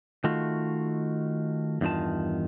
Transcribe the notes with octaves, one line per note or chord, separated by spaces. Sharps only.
D#3 A3 F4 F#4
E2 G2 D#3 F4 A5